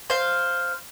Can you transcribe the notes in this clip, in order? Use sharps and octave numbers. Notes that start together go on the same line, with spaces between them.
C5 F5